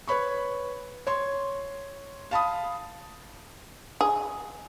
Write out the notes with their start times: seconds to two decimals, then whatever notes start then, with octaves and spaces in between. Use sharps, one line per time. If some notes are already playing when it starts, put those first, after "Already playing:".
0.08 B4 C#5 B5 C#6
1.07 C#5 C6
2.31 F5 A5 B5 D#6
4.01 G#4